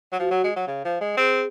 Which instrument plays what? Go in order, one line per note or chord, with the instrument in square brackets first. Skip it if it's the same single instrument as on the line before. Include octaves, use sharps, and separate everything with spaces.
[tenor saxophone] F#3
[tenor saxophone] F3 [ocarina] F#4
[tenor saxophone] F#3
G#3
F#3
C#3
F3
G#3
[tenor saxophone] C4 [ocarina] G#4